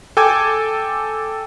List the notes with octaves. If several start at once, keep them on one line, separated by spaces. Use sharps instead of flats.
A4 G5 G#5 D6 G#6